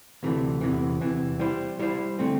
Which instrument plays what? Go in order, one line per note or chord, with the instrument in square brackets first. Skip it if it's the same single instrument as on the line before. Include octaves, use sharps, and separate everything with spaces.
[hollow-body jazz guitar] D2 C3 E3 A3
E2 C3 E3
E2 C3 E3
G3 E4 C5
G3 E4 C5
D3 A3 C4